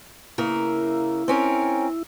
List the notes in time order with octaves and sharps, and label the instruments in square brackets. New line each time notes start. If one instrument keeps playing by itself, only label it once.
[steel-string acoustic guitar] C#3 A#3 A#4 [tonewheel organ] E4
[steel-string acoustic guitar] C4 C#4 A#4